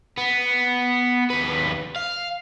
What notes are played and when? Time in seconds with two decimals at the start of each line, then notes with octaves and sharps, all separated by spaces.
0.17 B3
1.30 D#2 B4
1.96 F5